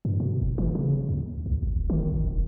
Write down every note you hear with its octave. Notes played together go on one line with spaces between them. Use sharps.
G2
B2
F#1
E3
C#3
D#2
C2
G#1
E1
D#3
G#1
E1